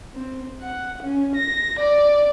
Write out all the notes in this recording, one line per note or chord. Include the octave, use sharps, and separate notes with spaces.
C4
F#5
C#4
A#6
D5